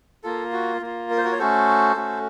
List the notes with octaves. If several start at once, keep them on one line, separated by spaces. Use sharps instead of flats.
A#3 F4 A4
F#4
A#3 F4
A#4
C5
F#4 A#4
C#5
A3 C#4 F#4 A4 C5
A3 C#4 F#4